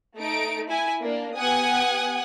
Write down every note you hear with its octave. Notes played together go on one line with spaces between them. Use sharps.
A3 D#4 D7
E4 G#5
A#3 D4
B3 G4 F#5 G#5 D#6